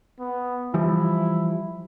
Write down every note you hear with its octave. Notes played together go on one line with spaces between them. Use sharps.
B3
E3 F3 G3 E4